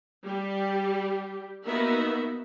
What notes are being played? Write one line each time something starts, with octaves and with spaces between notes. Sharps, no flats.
G3 G4
A#3 B3 D#4 F#4 A#4 E5